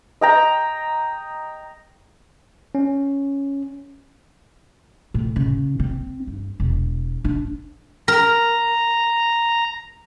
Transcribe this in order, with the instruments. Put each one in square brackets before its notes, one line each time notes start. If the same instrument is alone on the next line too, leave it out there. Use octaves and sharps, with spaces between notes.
[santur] D#5 G5 A#5
[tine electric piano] C#4
[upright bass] A2
C#3
C4
G2
E1
D4
[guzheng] A#4 [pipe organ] A#5